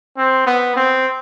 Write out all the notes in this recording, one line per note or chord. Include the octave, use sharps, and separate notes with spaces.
C4
B3
C4